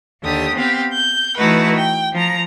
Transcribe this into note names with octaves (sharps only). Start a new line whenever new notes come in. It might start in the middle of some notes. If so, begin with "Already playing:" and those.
D#2 D3 G4 D#6
B3 C4 G4 F5
G6
E3 A3 D#4 E4 F#4 B4
G5
F3 A#5